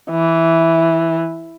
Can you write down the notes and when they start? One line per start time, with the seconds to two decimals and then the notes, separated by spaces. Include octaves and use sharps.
0.11 E3